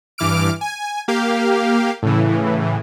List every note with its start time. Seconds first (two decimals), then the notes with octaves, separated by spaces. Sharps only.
0.18 G2 E3 D6 F6 D7
0.61 G#5
1.08 A#3 G4 F5
2.03 A2 C#3 E3